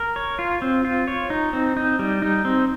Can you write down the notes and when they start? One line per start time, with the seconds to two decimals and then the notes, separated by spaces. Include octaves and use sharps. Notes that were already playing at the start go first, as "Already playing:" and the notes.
Already playing: A#4
0.16 C#5
0.39 F4
0.62 C4
0.85 F4
1.08 C#5
1.30 D#4
1.53 C4
1.77 D#4
1.99 G3
2.22 D#4
2.45 C4